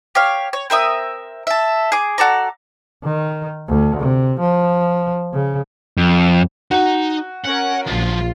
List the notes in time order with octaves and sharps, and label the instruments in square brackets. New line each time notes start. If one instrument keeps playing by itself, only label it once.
[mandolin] G4 C#5 F5
C#5
C4 A#4 E5 D#6
A4 E5
G#4 D6
F#4 A4 D5 A#5
[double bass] D#3
D2
C3
F3
C#3
[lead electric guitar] F2
[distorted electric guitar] D#4 A#5 [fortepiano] F#4
[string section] C#4 A#4 [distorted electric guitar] F#5
[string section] A#1 F4 [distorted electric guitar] F3 F#3